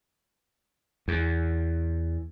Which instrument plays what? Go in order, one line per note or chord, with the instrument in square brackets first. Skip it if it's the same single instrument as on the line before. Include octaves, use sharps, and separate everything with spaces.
[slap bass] E2